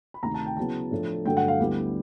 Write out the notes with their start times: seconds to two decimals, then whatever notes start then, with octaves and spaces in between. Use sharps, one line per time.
0.14 B5
0.23 D2 C3 D#3 A#5
0.34 A5
0.46 G5
0.57 C#3 F#3 B3 E4 A5
0.91 A2 F3 A3 D4
1.25 G2 D3 F#3 A3 G5
1.37 F#5
1.48 F5
1.60 D2 D3 G3 B3 E4